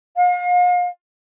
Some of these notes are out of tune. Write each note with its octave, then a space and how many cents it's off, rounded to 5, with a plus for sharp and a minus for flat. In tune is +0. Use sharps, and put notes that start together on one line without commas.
F5 +40